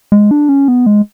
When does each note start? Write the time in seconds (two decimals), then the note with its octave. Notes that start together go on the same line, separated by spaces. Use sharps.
0.12 G#3
0.31 D4
0.49 C#4
0.68 B3
0.86 G#3